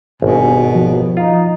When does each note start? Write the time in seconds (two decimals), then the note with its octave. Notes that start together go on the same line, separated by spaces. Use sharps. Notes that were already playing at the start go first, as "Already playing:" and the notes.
0.22 G#1 G2 B2 G#5
0.75 D#2 F3
1.17 D#4 F4